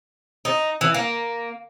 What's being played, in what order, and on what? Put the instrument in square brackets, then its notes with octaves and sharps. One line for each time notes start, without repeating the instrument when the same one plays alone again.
[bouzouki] D#4
E3
A#3